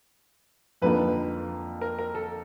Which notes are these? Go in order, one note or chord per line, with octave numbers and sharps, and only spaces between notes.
F2 D3 F3 A#3 D#4 B4
A#4
A#4
A4